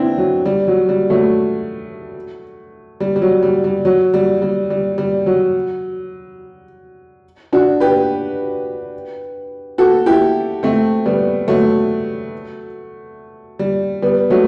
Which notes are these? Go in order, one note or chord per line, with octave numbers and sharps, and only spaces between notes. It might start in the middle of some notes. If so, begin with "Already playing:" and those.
Already playing: B3 C4 D4 E4
F#3
G3
F#3
G3
F#3 A3
G3
G3
F#3
G3
G3
F#3
G3
G3
G3
G3
F#3
D4 F#4
G4 B4
F#4 A4
E4 G4
A3 C4
G3 B3
F#3 A3
G3
G3 B3
F#3 A3